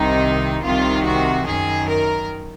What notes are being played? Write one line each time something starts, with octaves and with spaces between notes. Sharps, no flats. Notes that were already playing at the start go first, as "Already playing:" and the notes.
Already playing: C2 C3 D#3 D#4
C2 C3 D#3 F4
F#4
F#2 D#3 G#4
A#4